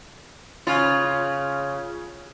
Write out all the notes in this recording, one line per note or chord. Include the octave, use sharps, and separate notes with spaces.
C#3 F4